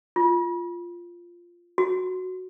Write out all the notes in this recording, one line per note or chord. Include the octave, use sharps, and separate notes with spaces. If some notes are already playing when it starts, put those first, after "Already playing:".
F4
F#4